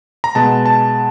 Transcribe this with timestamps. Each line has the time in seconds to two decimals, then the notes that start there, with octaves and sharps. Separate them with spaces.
0.24 A#5
0.35 B2 G#3 B3 A5
0.66 A5